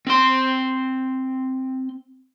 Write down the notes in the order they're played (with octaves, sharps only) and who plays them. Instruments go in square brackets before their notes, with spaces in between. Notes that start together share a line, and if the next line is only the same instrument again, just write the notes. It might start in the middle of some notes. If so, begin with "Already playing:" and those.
[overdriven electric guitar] C4 C6